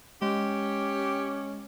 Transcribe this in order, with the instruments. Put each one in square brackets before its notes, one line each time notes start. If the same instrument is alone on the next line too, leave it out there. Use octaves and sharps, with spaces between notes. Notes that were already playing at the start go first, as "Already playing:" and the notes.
[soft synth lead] G#3 [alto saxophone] C#4 [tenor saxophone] G4